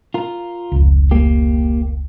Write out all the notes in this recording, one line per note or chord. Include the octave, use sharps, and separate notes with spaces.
F4 A#4
F1 C#2
A#3 G4